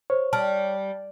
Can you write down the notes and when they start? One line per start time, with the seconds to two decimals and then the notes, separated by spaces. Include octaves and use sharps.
0.10 C5 C#5
0.33 G3 A5 F6